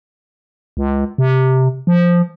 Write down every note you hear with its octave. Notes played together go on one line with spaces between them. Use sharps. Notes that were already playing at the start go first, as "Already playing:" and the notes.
C#2
C3
F3